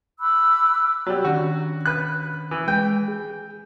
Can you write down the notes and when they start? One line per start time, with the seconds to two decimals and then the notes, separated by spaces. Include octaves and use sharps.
0.20 B5 D6 E6 F#6
1.07 F#3 G3
1.25 D#3 C#4 D4 F#4
1.86 B4 F#6
2.51 E3
2.68 G#3 B4 G5
3.08 G#4